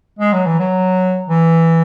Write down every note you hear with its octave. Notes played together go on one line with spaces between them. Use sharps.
G#3
F#3
E3
F#3
E3